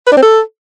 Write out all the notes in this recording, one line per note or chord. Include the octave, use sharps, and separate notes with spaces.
B4
D4
C4
A4